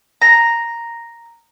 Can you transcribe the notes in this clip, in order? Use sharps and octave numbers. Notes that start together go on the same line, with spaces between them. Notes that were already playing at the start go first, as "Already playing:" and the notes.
A#5